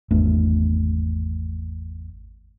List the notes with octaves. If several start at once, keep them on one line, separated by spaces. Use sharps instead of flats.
G#1 E2 A3 D4